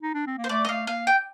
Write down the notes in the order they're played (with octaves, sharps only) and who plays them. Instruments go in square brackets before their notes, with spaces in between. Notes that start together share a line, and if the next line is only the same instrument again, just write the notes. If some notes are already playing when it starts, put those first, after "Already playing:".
[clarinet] D#4
D4
C4
A#3
[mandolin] C5
[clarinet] A3 [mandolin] D5
[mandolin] D#5
[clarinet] A3 [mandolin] F5
[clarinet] A#3 [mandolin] F5
[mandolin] G5